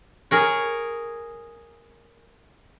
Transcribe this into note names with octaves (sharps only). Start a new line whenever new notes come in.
G#4 A#4 C#5